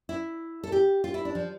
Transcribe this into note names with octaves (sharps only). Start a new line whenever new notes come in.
E4
A4
G4
F4
E4
D4
F3